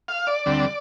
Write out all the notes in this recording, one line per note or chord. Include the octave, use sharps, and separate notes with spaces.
F5
D5
D2 D3 G3 C4